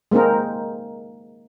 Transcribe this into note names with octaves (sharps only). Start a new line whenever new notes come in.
G#3 A#3 C4 D#4 A#4